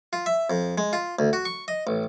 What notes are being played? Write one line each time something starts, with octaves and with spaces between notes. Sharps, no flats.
F4
E5
F2
G#3
F4
D2
F#4
C#6
D#5
A1